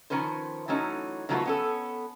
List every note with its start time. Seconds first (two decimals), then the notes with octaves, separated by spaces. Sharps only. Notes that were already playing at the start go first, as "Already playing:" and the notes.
0.10 D#3 F3 C#4 B4 C5
0.68 E3 F#3 A3 C#4 D#4
1.29 D#3 F3 F#3 A3 B3 F4
1.46 B3 C#4 A4